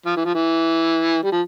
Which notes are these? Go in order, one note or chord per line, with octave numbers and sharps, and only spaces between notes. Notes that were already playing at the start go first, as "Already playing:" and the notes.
F3
E3
F3
E3
G3
F3